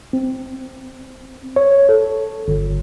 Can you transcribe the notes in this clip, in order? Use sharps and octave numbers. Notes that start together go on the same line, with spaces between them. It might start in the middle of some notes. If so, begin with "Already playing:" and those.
C4
C#5
A4
G1